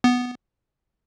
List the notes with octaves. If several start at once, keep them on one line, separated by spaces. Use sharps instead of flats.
B3